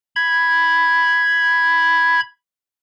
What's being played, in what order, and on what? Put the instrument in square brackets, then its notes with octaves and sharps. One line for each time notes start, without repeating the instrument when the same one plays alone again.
[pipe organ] B5 G#6